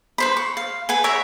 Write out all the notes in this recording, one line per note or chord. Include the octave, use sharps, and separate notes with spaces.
B4 C5 B5
C#6
F5
B4 F#5 G#5
A#4 C#5 E5 F#5